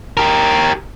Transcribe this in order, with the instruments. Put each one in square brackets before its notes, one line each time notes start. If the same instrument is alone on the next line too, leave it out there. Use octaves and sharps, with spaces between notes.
[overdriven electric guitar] G4 A#4